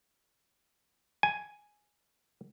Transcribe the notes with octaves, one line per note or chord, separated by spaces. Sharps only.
G#5